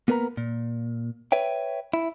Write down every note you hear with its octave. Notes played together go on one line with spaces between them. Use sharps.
A#3 B3 A#4 B4 A#5
A#2
B4 C#5 E5 G5
E4